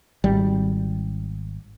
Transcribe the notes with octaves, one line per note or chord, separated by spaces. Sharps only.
G#1 G3